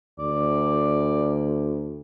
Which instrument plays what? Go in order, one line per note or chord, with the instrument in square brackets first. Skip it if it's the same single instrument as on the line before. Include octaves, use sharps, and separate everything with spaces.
[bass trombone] D2 [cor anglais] D5